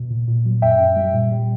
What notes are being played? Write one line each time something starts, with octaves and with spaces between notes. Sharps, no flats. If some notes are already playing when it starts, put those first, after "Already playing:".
Already playing: B2
A#2
A#2
F#3
F#2 E5 G5
F#2
G3
A#2
G3